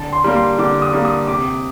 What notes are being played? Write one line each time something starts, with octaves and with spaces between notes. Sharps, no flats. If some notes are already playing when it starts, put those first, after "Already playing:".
Already playing: D3 A5
C6
G3 A#3
C6
D3 D6
D#6
G3 A#3
D#6
C3 D6